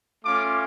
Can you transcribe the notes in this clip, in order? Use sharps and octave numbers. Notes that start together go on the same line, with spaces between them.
A3 C#4 F4 D6